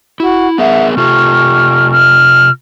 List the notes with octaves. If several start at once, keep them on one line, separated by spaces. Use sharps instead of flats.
E4 F#4
B3 G#4 A#4 E5 F#5
C3 F4 G4 A4 C#6 F6
F6